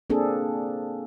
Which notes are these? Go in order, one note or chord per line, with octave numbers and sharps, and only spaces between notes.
A#3 C4 D4 G#4 A4